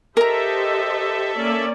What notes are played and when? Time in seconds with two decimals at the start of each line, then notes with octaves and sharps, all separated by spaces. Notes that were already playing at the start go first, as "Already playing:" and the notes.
0.17 G4 A4 A#4 C5 D#5 E5 A#5
1.36 A#3 C#4 D5